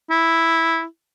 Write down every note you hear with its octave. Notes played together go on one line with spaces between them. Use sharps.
E4